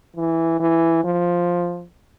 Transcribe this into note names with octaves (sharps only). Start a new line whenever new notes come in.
E3
E3
F3